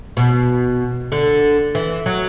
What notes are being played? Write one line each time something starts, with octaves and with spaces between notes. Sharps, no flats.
B2
D3
E3
F#3